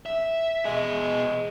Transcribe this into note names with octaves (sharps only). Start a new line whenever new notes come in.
E5
B2 G#3 G#4